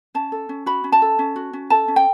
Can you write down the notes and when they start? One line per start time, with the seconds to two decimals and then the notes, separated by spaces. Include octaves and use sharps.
0.14 C#4 A5
0.32 A4
0.49 C#4
0.66 F#4 B5
0.84 C#4
0.92 A5
1.02 A4
1.19 C#4
1.36 F#4
1.53 C#4
1.70 A4 A5
1.88 C#4
1.96 G5